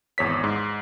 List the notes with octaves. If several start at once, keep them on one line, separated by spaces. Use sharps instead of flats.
G#1 E2 C#5 B6
G#2